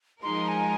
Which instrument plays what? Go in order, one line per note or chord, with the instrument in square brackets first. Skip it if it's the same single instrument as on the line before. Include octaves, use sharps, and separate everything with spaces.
[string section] F3 G#3 D#4 A#4 [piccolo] C6
[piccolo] G#5